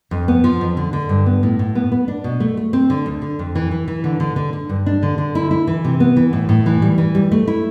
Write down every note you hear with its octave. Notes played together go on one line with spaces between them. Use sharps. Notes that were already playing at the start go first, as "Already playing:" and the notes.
F2
B3
F3
F2
D3
D3
G2
B3
A2
A2
B3
B3
D4
B2
A3
A3
C4
D3
D2
D3
F2
E3
E3
E3
D3
D3
D3
D3
G2
D4
D3
D3
E4
E4
E3
C3
B3
E3
A2
A2
E3
G3
E3
G3
A3
E4